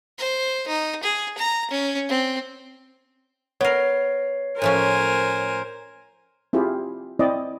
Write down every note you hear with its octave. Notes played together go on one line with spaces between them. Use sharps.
C5
D#4
G#4
A#5
C#4
C4
B3 A#4 C#5 C7
A2 F3 C#4 A#4 C5 G#5
C4 E4 F4 G4 G#4
C4 E4 D5 D#5